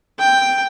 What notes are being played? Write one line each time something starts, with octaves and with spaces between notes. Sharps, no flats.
G5